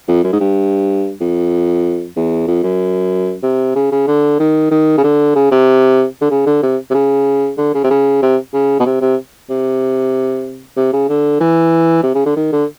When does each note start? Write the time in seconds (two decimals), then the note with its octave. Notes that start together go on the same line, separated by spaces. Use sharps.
0.08 F2
0.24 F#2
0.33 G#2
0.40 G2
1.21 F2
2.16 E2
2.48 F2
2.63 F#2
3.43 C3
3.76 C#3
3.92 C#3
4.07 D3
4.40 D#3
4.71 D#3
4.98 C#3
5.04 D3
5.36 C#3
5.51 C3
6.21 D3
6.31 C#3
6.46 D3
6.63 C3
6.90 C3
6.94 C#3
7.58 D3
7.74 C#3
7.84 C3
7.91 C#3
8.22 C3
8.54 C#3
8.80 B2
8.86 C3
9.01 C3
9.50 C3
10.77 C3
10.93 C#3
11.09 D3
11.40 E3
12.03 C3
12.15 C#3
12.26 D3
12.37 D#3
12.52 D3